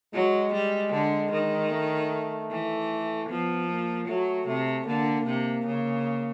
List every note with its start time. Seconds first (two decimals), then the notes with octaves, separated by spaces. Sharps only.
0.13 F#3 G#3
0.53 G3
0.93 D3
1.32 D#3
1.71 A3
2.50 E3
3.29 F3 B3
3.68 A#3
4.07 F#3 A3
4.47 C3 A3
4.86 D3 A#3
5.26 C3
5.66 C#3